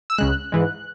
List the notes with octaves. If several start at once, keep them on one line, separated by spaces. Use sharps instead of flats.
E6
C#2 C#3 G#3 F#6
G#2 E3 G#3